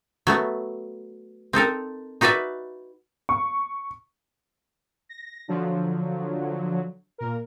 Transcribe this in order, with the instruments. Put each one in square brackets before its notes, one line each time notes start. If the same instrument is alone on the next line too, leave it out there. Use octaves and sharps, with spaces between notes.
[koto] F#3 A3 B3
C4 D#4 A4 A#4
D#4 F#4 B4 D5 E5
[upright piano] C#6
[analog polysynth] A#6
D3 F3 F#3
A#2 A#4